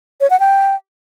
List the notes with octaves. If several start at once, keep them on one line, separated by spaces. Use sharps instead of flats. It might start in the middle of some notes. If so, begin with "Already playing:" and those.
C#5
F#5
G5